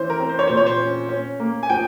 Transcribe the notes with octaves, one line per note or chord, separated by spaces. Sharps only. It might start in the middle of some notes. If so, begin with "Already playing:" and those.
Already playing: E3 C#4 C5
A#4
C4
C5
C#5
A#2 C5
C#5
C5
C#4
C#4
A#3
G#5
F3 G5